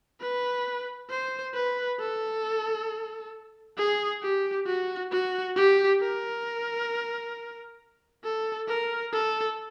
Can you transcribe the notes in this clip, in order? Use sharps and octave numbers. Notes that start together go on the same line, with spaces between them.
B4
C5
B4
A4
G#4
G4
F#4
F#4
G4
A#4
A4
A#4
A4